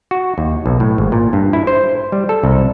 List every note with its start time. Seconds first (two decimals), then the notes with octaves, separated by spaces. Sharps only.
0.11 F#4
0.38 D#2
0.66 B1
0.80 A2
0.98 G#1
1.12 A#2
1.33 G2
1.53 E4
1.67 C5
2.12 G3
2.29 A4
2.44 C2